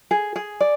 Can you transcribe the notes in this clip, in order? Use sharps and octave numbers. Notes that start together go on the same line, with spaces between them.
G#4
G#4
D5